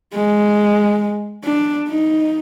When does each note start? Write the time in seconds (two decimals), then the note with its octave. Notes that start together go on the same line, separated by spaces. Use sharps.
0.14 G#3
1.45 D4
1.89 D#4